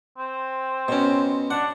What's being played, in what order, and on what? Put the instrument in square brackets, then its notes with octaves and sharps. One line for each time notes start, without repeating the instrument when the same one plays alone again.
[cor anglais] C4
[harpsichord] B2 C#4
[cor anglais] D4 [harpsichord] F#5